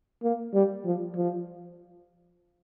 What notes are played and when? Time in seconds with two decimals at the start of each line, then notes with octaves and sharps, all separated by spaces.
0.23 A#3
0.54 G3
0.85 F3
1.15 F3